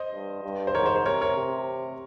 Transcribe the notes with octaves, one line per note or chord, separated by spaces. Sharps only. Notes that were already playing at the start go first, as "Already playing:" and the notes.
Already playing: C5 D#5
G2
G2
C5
G#2 A#4 C#5
C5
C5
C3 A#4 C#5
A#4 C#5
C3